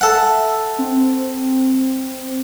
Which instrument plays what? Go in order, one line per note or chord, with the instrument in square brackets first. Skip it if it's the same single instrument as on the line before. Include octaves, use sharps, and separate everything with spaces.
[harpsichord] A4 F#5 [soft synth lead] E5
[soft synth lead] C4